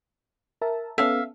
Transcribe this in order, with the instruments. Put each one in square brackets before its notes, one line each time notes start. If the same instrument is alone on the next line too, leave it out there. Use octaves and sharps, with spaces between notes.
[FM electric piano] A#4 E5 A5
[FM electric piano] B3 C#4 A4 [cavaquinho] E5 F5